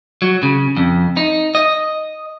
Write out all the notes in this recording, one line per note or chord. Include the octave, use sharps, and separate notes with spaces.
F#3
C#3
F2
D#4
D#5